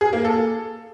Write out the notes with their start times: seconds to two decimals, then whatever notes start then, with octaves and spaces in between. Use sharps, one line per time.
0.01 G#4
0.13 A#3
0.25 A4